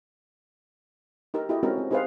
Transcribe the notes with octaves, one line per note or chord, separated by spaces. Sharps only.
D#4 G4 A#4
E4 F#4 G4 A4 D#5
G#3 C4 C#4 D#4 F#4 A#4
C4
D#4 G4 G#4 B4 C5 F5